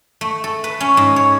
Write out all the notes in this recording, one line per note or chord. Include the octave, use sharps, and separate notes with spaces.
A3
A4
B4
C#4
G#2
C#5